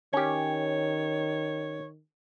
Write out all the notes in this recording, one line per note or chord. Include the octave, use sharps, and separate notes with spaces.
D#3 C#4 G4 C#5